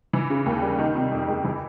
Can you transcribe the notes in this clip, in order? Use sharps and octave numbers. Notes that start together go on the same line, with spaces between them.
E3
C#3
D#2
G3
D#3
C3
F2
G#3
E3